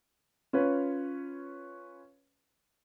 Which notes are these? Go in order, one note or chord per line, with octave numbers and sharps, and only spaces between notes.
C#4 F4 B4 C#5